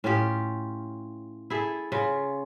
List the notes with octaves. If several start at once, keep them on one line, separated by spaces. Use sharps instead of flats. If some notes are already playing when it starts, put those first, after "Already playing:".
A2 C#4 F4 G4
E4 G#4 A4
C#3 F4